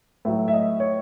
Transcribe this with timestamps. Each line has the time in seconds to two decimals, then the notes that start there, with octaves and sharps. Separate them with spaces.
0.25 A2 F#3 E5
0.48 E5
0.53 D#5
0.80 C#5